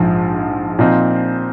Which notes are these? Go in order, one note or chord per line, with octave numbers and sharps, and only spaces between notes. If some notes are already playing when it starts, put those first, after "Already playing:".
Already playing: A#1 G#2 F3
A#2 F3 C4 D#4